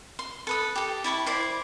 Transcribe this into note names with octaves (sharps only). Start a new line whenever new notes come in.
C6
A4 B4 D#6
G4 A4
E4 A5 B5 C#6
E4 C5 D5 D6